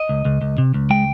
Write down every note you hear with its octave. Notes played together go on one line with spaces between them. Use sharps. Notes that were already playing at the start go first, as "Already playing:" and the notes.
Already playing: D#5
C#2
C#2
C#2
C3
C#2
G#3 G5